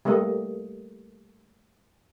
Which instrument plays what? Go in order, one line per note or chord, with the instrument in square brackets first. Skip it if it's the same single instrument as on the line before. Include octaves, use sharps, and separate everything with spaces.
[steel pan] G3 A3 A#3 D#5